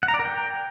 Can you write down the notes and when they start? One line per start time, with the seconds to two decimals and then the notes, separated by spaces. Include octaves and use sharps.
0.03 F#5
0.08 A#5
0.14 D5
0.19 A#4
0.25 G5